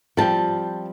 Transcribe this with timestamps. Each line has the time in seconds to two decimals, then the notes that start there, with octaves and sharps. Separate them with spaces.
0.17 F3 G3 C4 G5 A5